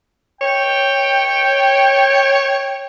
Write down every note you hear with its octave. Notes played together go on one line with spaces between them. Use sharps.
C#5 G5